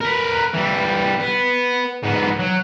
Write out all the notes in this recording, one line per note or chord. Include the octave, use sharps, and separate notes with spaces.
A#4 B4
E3 G3
B3
G#2 B3
F#3